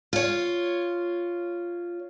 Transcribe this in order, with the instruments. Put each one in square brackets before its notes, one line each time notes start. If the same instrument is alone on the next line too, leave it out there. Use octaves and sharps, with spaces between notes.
[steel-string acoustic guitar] F4 C#5